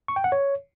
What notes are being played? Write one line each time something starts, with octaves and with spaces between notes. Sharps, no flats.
C#6
G5
F#5
C#5